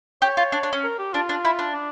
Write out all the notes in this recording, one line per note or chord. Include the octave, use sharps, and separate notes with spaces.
G4 C#5
F4
D4
D4
C#4
A#4
G4
D4 F4
D4
E4
D4
D4